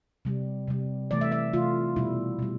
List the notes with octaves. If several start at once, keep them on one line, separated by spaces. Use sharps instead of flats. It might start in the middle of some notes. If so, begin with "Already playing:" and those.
C3 G3
C3 G3
C3 E3 A3 D5
E5
E5
C3 E3 A3 F4
B2 G3 E4
B2 G3